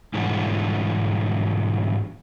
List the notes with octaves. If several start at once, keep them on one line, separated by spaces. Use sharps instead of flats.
G#2 B2 D3 E3 F#3 G3